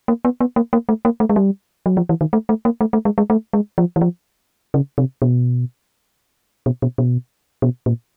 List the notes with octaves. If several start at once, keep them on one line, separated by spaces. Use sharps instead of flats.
A#3
B3
B3
A#3
A#3
A3
A#3
A3
G#3
G3
F#3
F3
E3
D#3
A3
A3
A#3
A3
A3
G#3
G#3
A3
G#3
F3
E3
F3
C#3
C3
B2
B2
B2
B2
B2
A#2